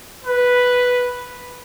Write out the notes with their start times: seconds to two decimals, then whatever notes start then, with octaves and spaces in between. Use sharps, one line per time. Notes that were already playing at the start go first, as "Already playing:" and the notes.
0.25 B4